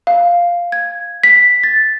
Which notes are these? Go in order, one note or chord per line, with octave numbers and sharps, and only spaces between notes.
F5
G#6
B6
A6